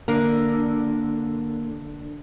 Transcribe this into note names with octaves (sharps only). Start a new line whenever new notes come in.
D3 A#3 D4 A#4